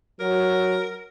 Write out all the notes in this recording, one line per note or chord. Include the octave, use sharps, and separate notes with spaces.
F#3 A#4